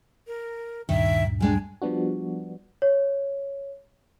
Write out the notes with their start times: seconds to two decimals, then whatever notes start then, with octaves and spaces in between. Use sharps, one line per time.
0.27 A#4
0.89 D2 G2 A#2 D#3 E5
1.40 G3 G#3 D4 G#5
1.82 F3 G3 B3 D4 F#4
2.82 C#5